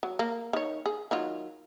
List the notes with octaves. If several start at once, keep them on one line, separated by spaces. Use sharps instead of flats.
F#3
A#3
D#3 C#5
G#4
D#3 F#3 F4